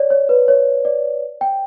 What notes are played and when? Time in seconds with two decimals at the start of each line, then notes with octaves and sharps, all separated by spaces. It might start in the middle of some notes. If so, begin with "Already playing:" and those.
Already playing: C#5 D5
0.10 C#5
0.29 B4
0.48 C#5
0.85 D5
1.41 G5